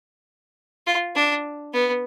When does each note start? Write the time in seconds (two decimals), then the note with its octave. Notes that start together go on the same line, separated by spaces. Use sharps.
0.87 F4
1.15 D4
1.73 B3